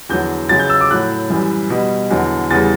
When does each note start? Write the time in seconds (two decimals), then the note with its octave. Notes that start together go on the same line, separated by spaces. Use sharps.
0.09 E2 D3 F#3 G6
0.49 F#2 C#3 F#3 A6
0.60 G6
0.70 E6
0.81 D6
0.91 A2 F#3 F#6
1.30 F#2 E3 G3
1.70 B2 G3
2.10 E2 D3 F#3
2.51 E2 C#3 G3 A6